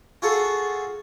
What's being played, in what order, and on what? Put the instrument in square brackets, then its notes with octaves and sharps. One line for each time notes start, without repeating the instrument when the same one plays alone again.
[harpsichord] F4 F#4 G#4 A4 F#5